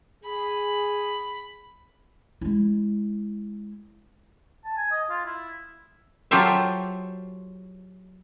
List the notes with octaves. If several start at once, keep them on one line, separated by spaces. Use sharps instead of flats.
G#4 B5
G#3 E4
A5
G#5
D#5
F4
E4
F#3 F4 G4 A4 C5 E5